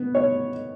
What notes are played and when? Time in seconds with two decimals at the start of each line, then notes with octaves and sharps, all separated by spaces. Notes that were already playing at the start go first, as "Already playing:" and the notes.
Already playing: B3
0.15 C#5